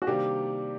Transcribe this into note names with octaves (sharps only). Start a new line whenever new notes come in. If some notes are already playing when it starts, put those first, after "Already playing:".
F#4
C3 D#3 G3 A#3 D4 G4